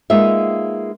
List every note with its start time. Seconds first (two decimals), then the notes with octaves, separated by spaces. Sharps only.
0.10 G#3 A#3 B3 D#4 F4 E5